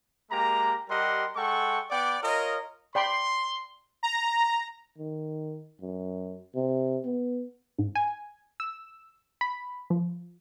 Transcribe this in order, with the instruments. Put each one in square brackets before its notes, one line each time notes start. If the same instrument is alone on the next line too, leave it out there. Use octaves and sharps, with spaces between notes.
[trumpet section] G#3 A#3 G4 A#5
G3 G4 A#4 D#5 F#5 C6
G#3 A4 F#5 G5 C#6
B3 D5 F#5 G5 D6
F4 A#4 C#5 D#5
[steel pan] D5 G5 B5 [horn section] C6
[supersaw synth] A#5
[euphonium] D#3
F#2
C3
B3
[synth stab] G#2
G#5
E6
B5
F3